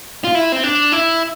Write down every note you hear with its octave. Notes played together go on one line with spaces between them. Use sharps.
F4
E4
C4
D4
E4